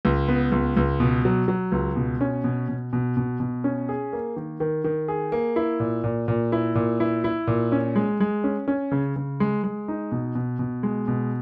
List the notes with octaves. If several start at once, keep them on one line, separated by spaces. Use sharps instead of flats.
C#2
B3
C#2
C#2
B2
F#3
F#3
C#2
B2
C#4
B2
B2
B2
B2
B2
C#4
G#4
A#3
D#3
D#3
D#3
G#4
A#3
E4
A#2
A#2
A#2
E4
A#2
E4
E4
A#2
C#4
G#3
G#3
C#4
C#4
C#3
C#3
G#3
G#3
D#4
B2
B2
B2
G#3
B2